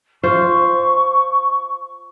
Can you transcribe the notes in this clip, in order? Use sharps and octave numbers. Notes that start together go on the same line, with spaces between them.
F4 C5 C#6